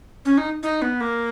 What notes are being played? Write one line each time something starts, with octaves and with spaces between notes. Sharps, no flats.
C#4
D#4
D#4
B3
A#3